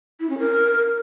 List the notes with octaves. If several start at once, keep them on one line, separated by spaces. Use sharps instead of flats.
E4
C#4
A#4